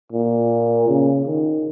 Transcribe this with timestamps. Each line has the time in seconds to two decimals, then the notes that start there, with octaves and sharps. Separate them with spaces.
0.12 A#2
0.88 C#3
1.26 D#3